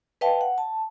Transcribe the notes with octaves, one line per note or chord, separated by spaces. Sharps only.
B4 D#5 F5 G5 A5
F#5
A5